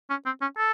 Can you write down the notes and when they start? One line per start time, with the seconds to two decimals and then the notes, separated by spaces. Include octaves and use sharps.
0.10 C#4
0.25 C4
0.41 C#4
0.58 A4